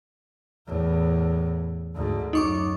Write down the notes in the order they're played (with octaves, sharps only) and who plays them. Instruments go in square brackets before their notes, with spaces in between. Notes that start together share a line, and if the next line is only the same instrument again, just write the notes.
[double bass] E2 A2
D2 G#2
[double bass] F#2 [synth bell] D#4 C#6 D6